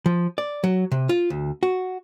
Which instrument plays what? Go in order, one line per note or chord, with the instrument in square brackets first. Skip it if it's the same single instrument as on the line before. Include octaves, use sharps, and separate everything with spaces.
[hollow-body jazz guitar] F3
D5
F#3
C3
F4
D2
F#4